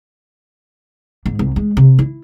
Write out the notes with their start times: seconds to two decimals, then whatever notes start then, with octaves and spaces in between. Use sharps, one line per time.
1.26 G#2
1.39 C2
1.56 G#3
1.77 C3
1.99 E4